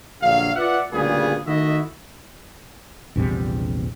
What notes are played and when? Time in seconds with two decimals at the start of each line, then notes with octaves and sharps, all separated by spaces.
0.22 A#1 D3 F#3 F5
0.55 F4 B4 D5 E5 F#5
0.93 D2 A#2 C#3 G3 B3 G#4
1.47 D#3 A3 E4 F#4 D#5 E5
3.16 A#1 E2 C3 G3